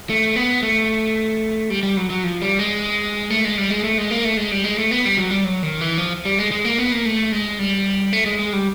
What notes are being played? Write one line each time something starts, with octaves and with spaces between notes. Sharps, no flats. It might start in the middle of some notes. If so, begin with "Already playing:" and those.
A3
B3
A3
G3
G3
F#3
F#3
F3
G3
G#3
A3
G#3
G3
G#3
A3
G#3
A#3
A3
G#3
G3
G#3
A3
B3
G3
F#3
G3
F#3
D#3
E3
F3
G3
G#3
G#3
A#3
B3
A#3
A3
G#3
G3
A3
G#3
G#3
G3